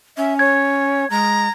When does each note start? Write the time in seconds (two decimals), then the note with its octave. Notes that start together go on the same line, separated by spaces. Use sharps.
0.17 C#4 E5
0.39 C#5 G#6
1.10 G#3 A#5